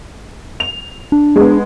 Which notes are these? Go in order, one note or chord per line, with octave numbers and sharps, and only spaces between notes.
F7
D4
G#3 B3